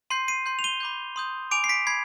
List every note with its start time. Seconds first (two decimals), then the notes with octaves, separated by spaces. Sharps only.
0.10 C6 G6 C7 D#7
0.28 C7 D#7
0.46 C6 G6
0.59 F7
0.64 D#7 G7
0.80 B5 D6 G6
1.16 C6 D#6 G6
1.51 G#5 B5 D6 D7 F7
1.64 C7
1.69 B6 D7
1.87 B5 G#6 C7